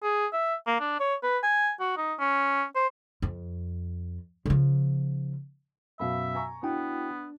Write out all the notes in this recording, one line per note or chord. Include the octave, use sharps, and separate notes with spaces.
G#4
E5
A#3
D4
C#5
B4
G#5
F#4
D#4
C#4
C5
F2
C#3 F3
F#2 B2 E5 F5 B5
G#5 A#5 C#6
B3 D4 E4 F#4 G5